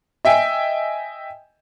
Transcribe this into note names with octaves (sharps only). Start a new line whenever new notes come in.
D#5 E5 G5 G#5